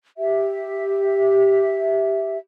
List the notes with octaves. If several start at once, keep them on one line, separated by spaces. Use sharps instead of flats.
G4 E5